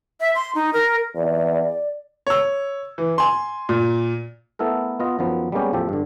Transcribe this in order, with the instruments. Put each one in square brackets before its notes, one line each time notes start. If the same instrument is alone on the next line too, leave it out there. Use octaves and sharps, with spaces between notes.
[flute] E5
C6
D#4
A#4
[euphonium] E2 [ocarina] D5
[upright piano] C#5 E6
E3
G#5 C6
A#2
[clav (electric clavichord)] A3 B3 E4 A4 A#4
B3 F4 D#5
F#2 D#3 F3 B3
G3 G#3 A#3 B3 C#4 G4
A1 E2 F3 G4 A4
G2 D3